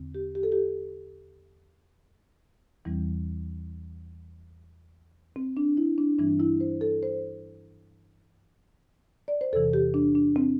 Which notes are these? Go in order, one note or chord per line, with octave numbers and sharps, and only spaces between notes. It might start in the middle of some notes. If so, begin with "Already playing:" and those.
Already playing: E2 D3 C4
G4
G4
A4
G4
E2 E3 G3 C4
C4
D4
E4
D4
G2 E3 G3 C4 D4
E4
C5
A4
C5
D5
C5
E2 C3 E3 A4
G4
D4
D4
C4